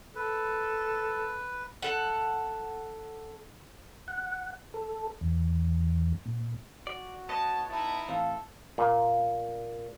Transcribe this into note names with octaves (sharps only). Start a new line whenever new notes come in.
A4 B4
A4 F#5
F#5
A4
E2
A#2
F#4 D5
B3 C#5 D#5 A5
D#4 E4 A5
A2 E3 C4 A4 F5
A#2